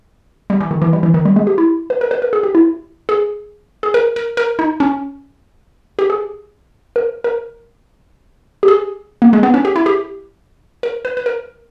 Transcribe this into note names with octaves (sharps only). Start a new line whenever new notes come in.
G3
E3
D#3
E3
G3
E3
D#3
G3
G#3
G4
E4
B4
A#4
B4
A#4
G#4
G4
E4
G#4
G#4
A#4
A#4
A#4
D#4
C#4
G4
G#4
A#4
A#4
G4
G#4
A#3
G#3
B3
C#4
G4
E4
G4
A#4
B4
B4
A#4